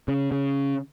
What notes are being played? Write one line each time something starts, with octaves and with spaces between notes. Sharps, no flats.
C#3
C#3